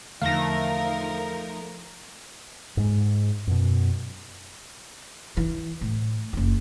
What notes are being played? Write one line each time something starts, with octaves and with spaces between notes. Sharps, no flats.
E2 D3 F3 A3 D#4 A#4 F5 A#6
G#2 G#3
F#2 B2
E3
A2
F#1 F4